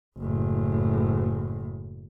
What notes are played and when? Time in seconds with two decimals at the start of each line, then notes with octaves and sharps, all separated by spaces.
0.18 F#1 A2